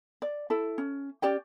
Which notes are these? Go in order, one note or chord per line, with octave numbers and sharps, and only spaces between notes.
D5
E4 A4
C#4
C#4 G4 D5 G5